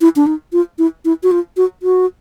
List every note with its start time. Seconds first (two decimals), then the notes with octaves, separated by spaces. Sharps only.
0.01 E4
0.16 D4
0.26 D#4
0.53 F4
0.79 E4
1.05 E4
1.23 F#4
1.31 F4
1.57 F#4
1.83 F#4